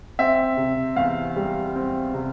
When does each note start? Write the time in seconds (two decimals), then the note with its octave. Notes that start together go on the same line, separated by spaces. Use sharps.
0.19 C4 E5
0.57 C3
0.96 E2 F5
1.36 G3
1.76 C4
2.14 C3